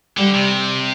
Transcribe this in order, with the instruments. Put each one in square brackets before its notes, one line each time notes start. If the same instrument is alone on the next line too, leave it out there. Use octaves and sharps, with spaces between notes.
[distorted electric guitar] D3 [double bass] G3
[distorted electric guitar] C3